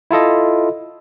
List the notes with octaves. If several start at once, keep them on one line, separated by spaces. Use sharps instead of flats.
E4 F4 A4 D#5